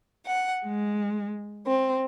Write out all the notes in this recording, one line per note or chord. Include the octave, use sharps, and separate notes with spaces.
F#5
G#3
C4